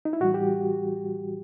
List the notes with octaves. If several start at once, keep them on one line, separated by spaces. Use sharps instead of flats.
D#4
E4
A2 E3 G3 F#4
G4